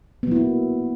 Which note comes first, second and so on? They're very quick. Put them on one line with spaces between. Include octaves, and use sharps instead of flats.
B3 F#3 E4 A#3